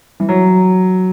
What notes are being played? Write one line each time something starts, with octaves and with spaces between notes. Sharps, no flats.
E3
F#3